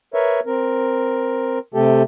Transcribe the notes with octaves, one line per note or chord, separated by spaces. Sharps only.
A#4 B4 C#5 E5
C4 A#4
C3 A3 G4 A4